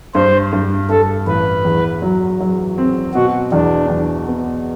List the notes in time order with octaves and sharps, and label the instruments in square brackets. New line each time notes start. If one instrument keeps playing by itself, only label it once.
[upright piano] G2 [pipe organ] C5
[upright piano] G2
[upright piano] G2 [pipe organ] A4
[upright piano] A1 [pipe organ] B4
[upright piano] E2
F#3
F#3
C4
[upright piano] B2 [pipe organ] F#4
[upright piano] E2 [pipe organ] D4
[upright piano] E2
B3